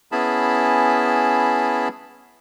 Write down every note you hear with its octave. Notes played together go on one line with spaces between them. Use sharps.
B3 C#4 E4 G#4 A5 B5